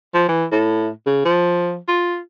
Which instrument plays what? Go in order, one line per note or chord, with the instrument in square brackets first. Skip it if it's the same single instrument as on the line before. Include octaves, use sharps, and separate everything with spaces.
[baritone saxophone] F3
E3
A2
C#3
F3
F4